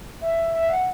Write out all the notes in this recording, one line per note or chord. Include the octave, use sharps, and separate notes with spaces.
E5
E5
F#5